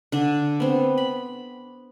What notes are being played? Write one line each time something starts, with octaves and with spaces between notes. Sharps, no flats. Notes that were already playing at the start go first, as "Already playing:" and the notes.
D3 D4
B3 C4
B5